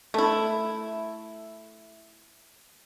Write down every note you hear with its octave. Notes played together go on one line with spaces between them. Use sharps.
A3 E4